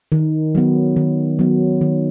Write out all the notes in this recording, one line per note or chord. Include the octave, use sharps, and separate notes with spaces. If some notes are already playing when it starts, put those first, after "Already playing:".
D#3
F#3 B3
D#3
F#3 B3
D#3